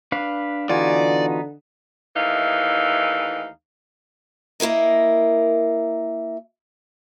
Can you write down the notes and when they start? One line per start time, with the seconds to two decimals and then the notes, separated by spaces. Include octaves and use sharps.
0.12 D4 B4 F5
0.69 D3 E3 B3 D#4 F4 F#4 D5 G#5
2.16 D#2 E3 A3 D#4 F5
4.60 A#3 E4 A#4 D#5